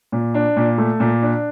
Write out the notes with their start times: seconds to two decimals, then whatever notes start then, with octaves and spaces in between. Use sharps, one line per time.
0.12 A#2
0.34 D4
0.57 A#2
0.78 A3
1.00 A#2
1.22 D4